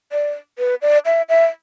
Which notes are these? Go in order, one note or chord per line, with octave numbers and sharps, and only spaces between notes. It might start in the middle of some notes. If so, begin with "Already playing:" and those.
D5
B4
D5
E5
E5